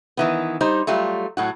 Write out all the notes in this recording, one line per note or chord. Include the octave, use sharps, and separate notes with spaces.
D#3 E3 B3
G3 D#4 C5
F#3 G3 A3 F4
A2 F#3 F#4